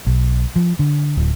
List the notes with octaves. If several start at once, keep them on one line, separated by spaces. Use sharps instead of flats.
B1
F3
D3
D1